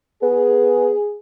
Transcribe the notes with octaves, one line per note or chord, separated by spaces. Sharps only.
B3 G#4